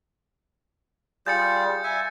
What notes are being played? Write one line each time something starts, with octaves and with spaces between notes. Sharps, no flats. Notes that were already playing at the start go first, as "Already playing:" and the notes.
G3 F4 G#4 G6 A6 C#7
E5 G#5